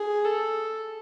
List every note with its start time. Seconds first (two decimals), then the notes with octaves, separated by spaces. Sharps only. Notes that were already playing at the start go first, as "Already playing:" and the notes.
Already playing: G#4
0.25 A4